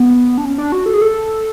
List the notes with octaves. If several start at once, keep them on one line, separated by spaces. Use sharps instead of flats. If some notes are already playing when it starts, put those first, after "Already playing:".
Already playing: B3
D4
C#4
D4
F#4
A4
G#4
A4